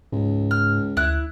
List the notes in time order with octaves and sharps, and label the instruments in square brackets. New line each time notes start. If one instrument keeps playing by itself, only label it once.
[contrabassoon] C#2 [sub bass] G#2
[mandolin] F6
[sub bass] D2 [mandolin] E4 F#6